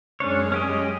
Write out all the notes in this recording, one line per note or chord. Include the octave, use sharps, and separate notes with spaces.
F#2 G#3 C#4 D4 G#4 C#5
C#4 G4 D#5